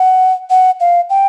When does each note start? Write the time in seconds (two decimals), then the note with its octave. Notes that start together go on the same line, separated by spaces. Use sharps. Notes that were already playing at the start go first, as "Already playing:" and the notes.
Already playing: F#5
0.50 F#5
0.80 F5
1.10 G5